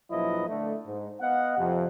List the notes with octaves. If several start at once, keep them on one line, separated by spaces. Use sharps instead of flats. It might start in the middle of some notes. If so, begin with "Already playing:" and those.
A#1 F3 F#3 E4 B4 D#5
D3 A3
G#2
B3 D#5 F5 F#5
F2 C3